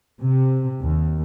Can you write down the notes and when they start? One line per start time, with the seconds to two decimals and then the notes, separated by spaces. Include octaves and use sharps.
0.20 C3
0.82 D#2